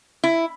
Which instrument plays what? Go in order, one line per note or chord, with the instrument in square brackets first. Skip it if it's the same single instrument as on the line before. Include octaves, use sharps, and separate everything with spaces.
[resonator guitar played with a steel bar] E4